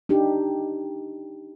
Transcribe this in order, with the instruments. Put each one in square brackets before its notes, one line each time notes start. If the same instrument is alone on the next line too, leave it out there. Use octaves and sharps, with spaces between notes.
[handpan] D4 D#4 G4